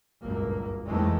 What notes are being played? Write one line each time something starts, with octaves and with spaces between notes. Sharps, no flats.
G1 C#2 F#2 A#2 A#3
F2 D#3 E3 G#3 A3